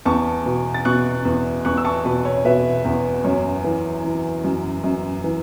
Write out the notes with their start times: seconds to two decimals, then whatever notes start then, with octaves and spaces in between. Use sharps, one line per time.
0.06 E2 A5 C#6
0.46 B2
0.74 A6
0.85 B2 C#6 F#6
1.25 E2
1.65 E2 C#6 F#6
1.77 E6
1.84 A5 C#6
2.05 B2 B4
2.25 C#5
2.45 B2 B4 E5
2.85 E2
3.24 F#2 C#5
3.64 E3
4.04 E3
4.44 F#2
4.84 F#2
5.24 E3